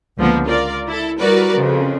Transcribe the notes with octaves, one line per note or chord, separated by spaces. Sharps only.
C#2 D3 F3 A#3 B3
F4 A#4 D5
E4 A4
G3 E4 F#4 A#4 B4 D5
F2 C#3